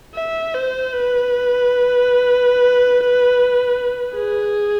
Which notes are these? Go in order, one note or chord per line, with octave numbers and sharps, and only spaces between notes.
E5
C5
B4
G#4